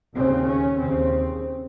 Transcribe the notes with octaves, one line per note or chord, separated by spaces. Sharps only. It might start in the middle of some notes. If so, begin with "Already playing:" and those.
D#2 C#3 C4
C#4
D#2 C#3 C4